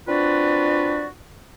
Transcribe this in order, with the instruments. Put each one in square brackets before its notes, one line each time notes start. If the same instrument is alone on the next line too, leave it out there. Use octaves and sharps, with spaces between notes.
[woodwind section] C4 D4 F4 F#4 B4 D5